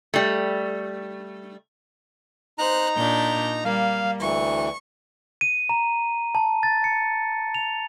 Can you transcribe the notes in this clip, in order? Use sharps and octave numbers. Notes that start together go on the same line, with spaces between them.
G3 A3
D#4 C5 A#5 F#6
A#2 D4 G6
G3 A#3 F5
D2 E3 C#6
D#7
A#5
A5
A6
C#7
F7